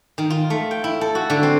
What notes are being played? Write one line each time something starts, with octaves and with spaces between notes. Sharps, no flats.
D#3
F4
A3
G5
E4
A4
F#4
D3
C4